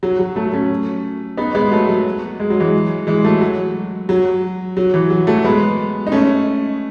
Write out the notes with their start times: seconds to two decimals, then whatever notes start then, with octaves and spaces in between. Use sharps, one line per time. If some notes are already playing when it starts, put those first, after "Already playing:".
0.03 F#3
0.19 F#3
0.36 F#3 A3
0.53 A3 C#4
1.37 B3 D#4
1.55 G#3 B3
1.72 F#3 A3
1.89 F#3
2.40 G#3
2.50 F#3
2.60 E3 G#3
3.07 E3 G#3
3.24 F#3 A3
3.41 F#3
4.09 F#3
4.77 F#3
4.94 E3
5.10 F#3
5.27 F#3 A3
5.44 G#3 B3
6.07 D#4
6.12 A3 C#4